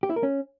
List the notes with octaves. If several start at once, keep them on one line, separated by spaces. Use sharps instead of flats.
G4
E4
A#4
C#4